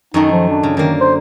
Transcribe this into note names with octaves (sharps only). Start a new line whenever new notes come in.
F#2 D#3 A3 D#4
F3
D4
C#3
D3 D#3 A#3
C5